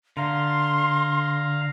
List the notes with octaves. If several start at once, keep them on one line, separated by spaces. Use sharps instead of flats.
D3 F5 A#5 C6